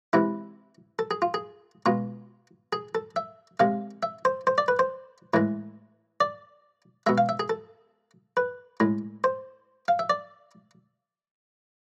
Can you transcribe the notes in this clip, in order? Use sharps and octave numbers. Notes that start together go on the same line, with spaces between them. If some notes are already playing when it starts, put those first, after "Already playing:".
C3 E3 G#3 E4
A4
G#4
F4
G#4
B2 G#3 F4
G#4
A4
E5
C3 G#3 F5
E5
C5
C5
D5
B4
C5
A2 E3 G#3
D5
B2 G#3 E5
F5
E5
G#4
A4
B4
A2 G#3
C5
F5
E5
D5